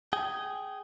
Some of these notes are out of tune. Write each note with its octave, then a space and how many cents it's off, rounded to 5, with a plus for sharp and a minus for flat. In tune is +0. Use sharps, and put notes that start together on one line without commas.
G#4 +0 G5 -20